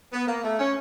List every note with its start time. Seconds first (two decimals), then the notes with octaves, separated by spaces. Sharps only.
0.13 B3
0.28 A#3
0.44 A3
0.59 C#4